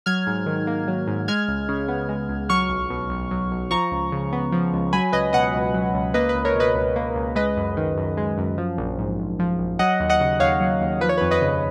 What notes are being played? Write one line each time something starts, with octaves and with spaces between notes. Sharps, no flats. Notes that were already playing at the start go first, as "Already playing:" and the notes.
F#3 F6 G#6
G#2
D#3
A#3
F#3
G#2
G#3 F6 G#6
C#2
C#3
B3
G#3
C#2
F#3 C#6 F6
B1
B2
B1
F#3
B1
F3 A#5 C#6
C#2
C#3
B3
F3
C#2
F#3 G#5 B5
C#2 B4 D#5
B2 D#5 F#5
C#2
F#3
C#2
A#3 B4 D#5
B4
C#2
A#4 C#5
B2 B4 D#5
C#2
A#3
C#2
G#3 B4 D#5
F#2
D#3
F#2
G#3
F#2
F3
A#1
G#2
A#1
F3
A#1
F#3 D#5 F#5
D#2
D#5 F#5
C#3
D#2 C#5 F5
F#3
D#2
F3 B4
C#5
F2 B4
B4 D#5
C#3